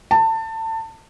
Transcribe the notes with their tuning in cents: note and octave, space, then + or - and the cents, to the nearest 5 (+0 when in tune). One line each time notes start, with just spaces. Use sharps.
A5 +25